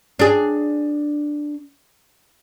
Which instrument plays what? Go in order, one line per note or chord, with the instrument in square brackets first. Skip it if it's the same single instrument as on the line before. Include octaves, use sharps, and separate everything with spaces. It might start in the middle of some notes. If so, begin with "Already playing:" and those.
[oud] D4 G#4